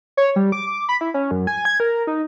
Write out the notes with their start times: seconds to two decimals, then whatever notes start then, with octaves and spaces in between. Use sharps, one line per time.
0.17 C#5
0.36 G3
0.52 D6
0.67 D6
0.89 B5
1.01 E4
1.14 C#4
1.31 F#2
1.47 G#5
1.65 G#6
1.80 A#4
2.07 D#4